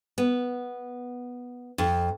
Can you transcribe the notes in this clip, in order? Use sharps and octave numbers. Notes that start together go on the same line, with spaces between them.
B3
F2